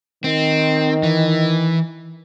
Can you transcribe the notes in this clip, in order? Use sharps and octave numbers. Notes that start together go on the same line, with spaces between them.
D#3 C4
E3